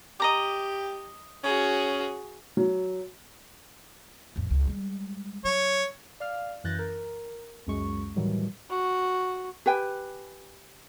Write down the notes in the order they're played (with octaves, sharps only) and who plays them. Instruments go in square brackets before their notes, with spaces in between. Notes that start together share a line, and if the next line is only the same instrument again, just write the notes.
[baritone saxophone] G4 [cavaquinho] D#5 A#5 D6
[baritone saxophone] C#4 [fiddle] F#4 G#4
[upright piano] F#3
[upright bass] A1 F2
C#2
G3 G#3
[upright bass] F#3 [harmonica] C#5
[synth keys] D5 F5 F6
F#2 E3 F#6 G6 A6 A#6
A#4
C#2 F#2 G#3 C#6
A2 D#3 E3 F#3 G3
[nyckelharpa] F#4
[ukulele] G4 B4 G5 G#5